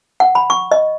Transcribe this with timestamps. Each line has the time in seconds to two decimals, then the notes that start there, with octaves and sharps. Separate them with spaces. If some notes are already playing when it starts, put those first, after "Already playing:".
0.20 F#5
0.35 B5
0.50 C#6
0.72 D#5